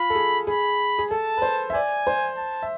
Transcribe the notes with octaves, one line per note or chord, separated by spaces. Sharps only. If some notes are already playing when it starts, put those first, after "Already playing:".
Already playing: F4 B5
A4
G#4
G#4 B5
G#4
A4 A5
B4
C5
E5
D5 G#5
C5
A5
E5